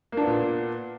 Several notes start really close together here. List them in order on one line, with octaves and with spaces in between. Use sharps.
A#3 D4 B3 A#2